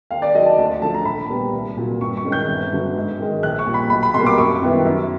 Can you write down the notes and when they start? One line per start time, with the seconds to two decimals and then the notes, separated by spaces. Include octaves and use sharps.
0.11 D#2 F5
0.22 D5
0.35 D#3 F#3 D#5
0.46 A5
0.58 D2 A5
0.81 D3 F3 A3 A5
0.94 A#5
1.05 A#1 B5
1.29 A#2 G3 B3
1.53 C2
1.77 A#2 F#3
2.01 G2 C#6
2.17 C#6
2.25 D#3 G#3 C#4
2.32 G6
2.48 G1
2.72 G2 D3 F#3
2.96 G#2
3.19 D#3 G#3
3.43 A#1 F#6
3.59 C#6
3.66 A#2 G3
3.74 B5
3.90 B1 B5
4.03 B5
4.14 B2 G3 A#3 C6
4.26 D6
4.38 F#2 C#6
4.62 D#3 G3 B3 E4
4.85 F#2